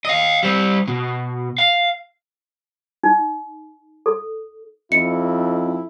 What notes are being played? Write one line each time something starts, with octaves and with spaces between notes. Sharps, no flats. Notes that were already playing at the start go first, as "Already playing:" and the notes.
D#5 F5
G3 C5
B2
F5
D#4
A4
F2 D#4 E4 C#7